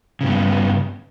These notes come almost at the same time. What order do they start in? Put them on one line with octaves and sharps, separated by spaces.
C#3 G2 B3